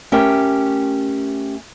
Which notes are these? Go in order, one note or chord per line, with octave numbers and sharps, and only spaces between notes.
A3 C#4 G4 A#4 E5 G5